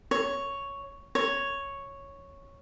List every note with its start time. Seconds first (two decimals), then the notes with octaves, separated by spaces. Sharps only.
0.11 C#5
1.15 C#5